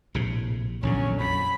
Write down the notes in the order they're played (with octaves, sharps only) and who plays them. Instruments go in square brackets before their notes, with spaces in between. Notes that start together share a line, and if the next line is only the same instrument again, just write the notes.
[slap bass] A#1 A2 C3
[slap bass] A#1 E2 D3 [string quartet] F#3 C#4
[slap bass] F2 [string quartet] B5